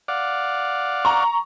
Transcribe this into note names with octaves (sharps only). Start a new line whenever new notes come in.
D5 F5 F#5
A#5 C#6